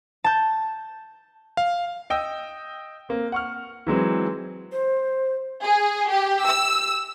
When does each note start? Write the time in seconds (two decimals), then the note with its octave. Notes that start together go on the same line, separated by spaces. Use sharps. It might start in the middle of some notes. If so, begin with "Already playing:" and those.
0.24 A5 G6
1.57 F5
2.10 D#5 G5 D#6 E6
3.09 A#3 C4
3.32 F#5 C#6 F6
3.87 E3 F#3 G#3 C4
4.72 C5
5.62 G#4
6.10 G4
6.44 E6